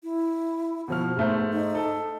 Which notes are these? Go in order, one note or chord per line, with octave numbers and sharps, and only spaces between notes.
E4
B2 F3 F#4 F6
G#2 A3 B3 C5
D#4
A4